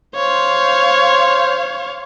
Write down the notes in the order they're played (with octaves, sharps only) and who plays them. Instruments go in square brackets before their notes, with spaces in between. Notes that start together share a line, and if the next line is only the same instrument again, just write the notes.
[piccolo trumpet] C5 [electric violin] C#5 F5